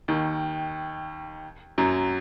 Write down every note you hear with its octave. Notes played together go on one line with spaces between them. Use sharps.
D#2 D#3
F#2 F#3